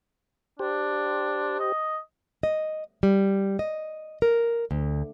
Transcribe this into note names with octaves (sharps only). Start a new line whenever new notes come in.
D4 G4 C5
D#5
D#5
G3
D#5
A#4
D2